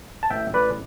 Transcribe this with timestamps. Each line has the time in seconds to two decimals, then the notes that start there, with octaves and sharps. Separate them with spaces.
0.23 A5
0.30 A1 E5 G5
0.53 A1 B4 D5